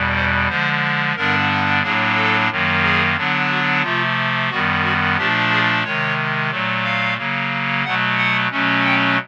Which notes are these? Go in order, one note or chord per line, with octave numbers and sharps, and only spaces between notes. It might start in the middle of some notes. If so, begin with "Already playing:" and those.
Already playing: E2 B2 G3
C5
D3 F3 G#3 C5
G2 D3 G3 B3 D4 A#4
A2 F#3 A#3 D4 G#4
A4
F#2 D#3 F#3 A#3
G#4
D3 F#3 B3 D4
F#4
C3 F3 A3 F4
F#2 D#3 G3 B3 F#4
F#4
A#2 F3 A3 D4 G4
G#4
C3 D#3 G#3 C#5
A#2 F#3 A3
F5
C#3 F#3 A#3
B2 F#3 A3 F#5
F#5
B2 F#3 A3 C#4
G5